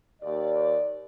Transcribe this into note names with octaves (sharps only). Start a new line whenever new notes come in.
D#2 D5